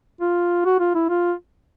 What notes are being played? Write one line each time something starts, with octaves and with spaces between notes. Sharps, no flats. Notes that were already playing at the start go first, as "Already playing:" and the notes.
F4
F#4
F4
E4
F4